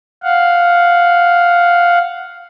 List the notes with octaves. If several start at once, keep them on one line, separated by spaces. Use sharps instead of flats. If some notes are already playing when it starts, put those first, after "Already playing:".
F5 F#5